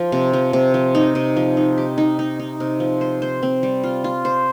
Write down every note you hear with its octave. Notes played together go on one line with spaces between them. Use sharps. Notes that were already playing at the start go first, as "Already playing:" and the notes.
Already playing: F3
C3
F3
C3
F3
D#4
C3
F3
D#4
G4
D#4
D#4
D#4
C3
F3
C5
C5
C4
G3
F4
F4
C5